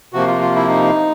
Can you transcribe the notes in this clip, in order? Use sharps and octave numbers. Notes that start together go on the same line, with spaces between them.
C3 F3 A#3 F#4
F4
F4
E4
D#4